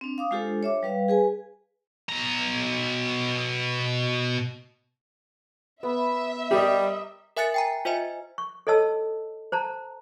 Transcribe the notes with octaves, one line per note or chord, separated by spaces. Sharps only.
C4 D4
F5 D6 D#6
G#3 D4 F4 G4 A4 C5
C#5 E5 D6
G3 B4 F5
G#4 B4 G#5
B2 A#5
B3 E5
G3 G4 A#4 D#5
A#4 E5 G#5 F#6 A6 C#7
G5 G#5 A#5
F4 C5 D#5 E5 G#5
C#6
A4 C#5 D#5 A5 E6
C5 A5 A#5